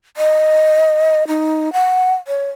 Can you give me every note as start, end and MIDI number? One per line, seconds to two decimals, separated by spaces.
0.17 1.27 75
1.28 1.72 63
1.73 2.14 78
2.27 2.48 73